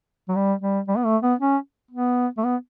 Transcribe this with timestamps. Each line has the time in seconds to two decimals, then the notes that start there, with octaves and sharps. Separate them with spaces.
0.28 F#3
0.35 G3
0.61 G3
0.88 G3
0.97 B3
1.05 A3
1.22 B3
1.39 C#4
1.91 B3
2.37 A3
2.44 B3